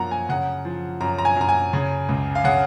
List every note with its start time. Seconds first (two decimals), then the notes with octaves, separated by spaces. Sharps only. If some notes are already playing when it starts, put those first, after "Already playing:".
Already playing: F#2 F3 A#3 F#5 A#5
0.11 G#5
0.29 C#3 F#5
0.65 F3
1.01 F#2 A#5
1.19 A#5
1.25 G#5
1.36 F#2 A#5
1.49 G#5
1.73 C#3
2.09 C#2
2.35 F5
2.44 C#3 F#5